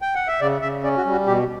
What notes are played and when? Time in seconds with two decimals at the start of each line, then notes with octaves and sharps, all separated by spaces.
0.02 G5
0.15 F#5
0.28 E5
0.41 C#3 D5
0.62 C#3 E5
0.84 C#4 D5
0.97 F#4
1.05 G3
1.12 F#4
1.26 B2 G4